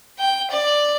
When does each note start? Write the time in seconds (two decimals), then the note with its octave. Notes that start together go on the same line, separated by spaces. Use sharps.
0.19 G5
0.51 D5